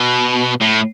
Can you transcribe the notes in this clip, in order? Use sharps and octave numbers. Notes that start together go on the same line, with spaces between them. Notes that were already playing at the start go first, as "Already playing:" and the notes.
Already playing: B2
A2